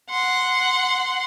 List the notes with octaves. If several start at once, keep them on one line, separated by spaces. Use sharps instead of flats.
F#5 C6